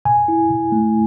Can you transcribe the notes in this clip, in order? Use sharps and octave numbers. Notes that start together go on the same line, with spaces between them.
B2 G#5
E4
B2
A3